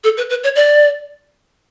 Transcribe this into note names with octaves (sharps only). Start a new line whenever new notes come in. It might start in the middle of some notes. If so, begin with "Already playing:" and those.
A4
B4
B4
C#5
D5